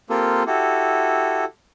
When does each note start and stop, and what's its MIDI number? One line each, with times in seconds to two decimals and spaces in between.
0.10 0.43 58
0.10 0.43 60
0.10 0.43 65
0.10 0.43 67
0.10 0.43 69
0.10 0.43 70
0.47 1.45 64
0.47 1.45 66
0.47 1.45 67
0.47 1.45 69